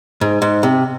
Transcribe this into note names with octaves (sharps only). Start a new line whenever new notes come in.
G#2
G#2
C3